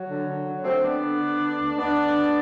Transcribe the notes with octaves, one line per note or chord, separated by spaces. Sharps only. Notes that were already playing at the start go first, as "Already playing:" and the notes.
Already playing: F#3
D3
D3
D3
D3 A3 C4
D3 B3 D4
D3
D3
D3
D2
D2 B3 D4
D3
D2